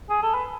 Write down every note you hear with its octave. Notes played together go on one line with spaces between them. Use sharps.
G#4
A4
B4